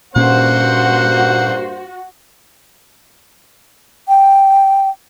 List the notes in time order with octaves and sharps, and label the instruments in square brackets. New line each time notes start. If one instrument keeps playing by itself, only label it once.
[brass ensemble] G2 A#3 C5 [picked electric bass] A#2 C#4 [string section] F#4 [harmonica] F#5
[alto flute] G5